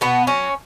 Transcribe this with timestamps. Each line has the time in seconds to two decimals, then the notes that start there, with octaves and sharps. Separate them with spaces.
0.01 B2 B3
0.27 F#3 C#4